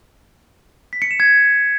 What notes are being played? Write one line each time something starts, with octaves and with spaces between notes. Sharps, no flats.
B6
C#7
E7
G#6